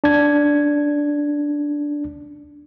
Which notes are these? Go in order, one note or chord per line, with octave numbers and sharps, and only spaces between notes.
D4 G#6